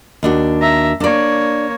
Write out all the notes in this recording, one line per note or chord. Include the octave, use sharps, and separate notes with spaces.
D#2 D4 F#4
E5 A#5
A#3 D4 C#5 D5